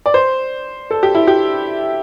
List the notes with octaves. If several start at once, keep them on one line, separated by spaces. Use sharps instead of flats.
D5
C5
A4
G4
E4
G4